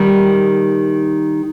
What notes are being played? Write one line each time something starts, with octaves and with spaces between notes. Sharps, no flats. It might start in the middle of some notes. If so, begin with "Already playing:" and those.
Already playing: D#3 G3